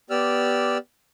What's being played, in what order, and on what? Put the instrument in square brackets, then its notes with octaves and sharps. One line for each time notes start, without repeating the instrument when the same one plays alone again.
[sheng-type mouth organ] B3 G4 D5 E6 F6